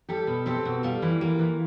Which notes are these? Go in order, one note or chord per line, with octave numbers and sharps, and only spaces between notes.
G3 G4 A4
B2
C4 G4 A4
B2
G3 F4 G4
E3
A#3
E3